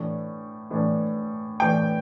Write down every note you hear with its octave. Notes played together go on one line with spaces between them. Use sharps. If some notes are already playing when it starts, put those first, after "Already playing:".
Already playing: A2 E3 A3 D4
A2 E3 A3 D4
A2 E3 A3 D4 G5